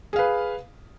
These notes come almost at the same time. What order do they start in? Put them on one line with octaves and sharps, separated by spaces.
G#4 F5 B4